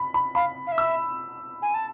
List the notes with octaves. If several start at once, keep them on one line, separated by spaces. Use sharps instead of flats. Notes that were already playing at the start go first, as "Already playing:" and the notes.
Already playing: B5
B5
F5 B5
F5
E5
E6
G#5
A5